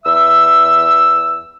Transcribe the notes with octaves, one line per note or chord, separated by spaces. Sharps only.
E2 E5 E6